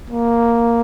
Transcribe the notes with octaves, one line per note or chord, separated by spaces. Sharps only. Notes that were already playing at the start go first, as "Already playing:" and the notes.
A#3